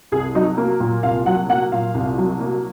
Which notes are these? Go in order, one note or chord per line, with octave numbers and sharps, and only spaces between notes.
C2 G#4
F#3 D#4
A#3
A#2
C2 F5
F#3 F#5
A#3 F#5
A#2 F5
C2
F#3
A#3